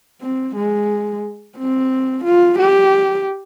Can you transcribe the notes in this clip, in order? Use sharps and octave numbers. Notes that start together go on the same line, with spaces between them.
C4
G#3
C4
F4
G4